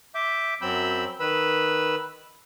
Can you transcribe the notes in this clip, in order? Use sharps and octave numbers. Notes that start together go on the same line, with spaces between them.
E5 D6 G6
F#2 F#3 C4 B5 E6 G6
D#3 B4 B5 E6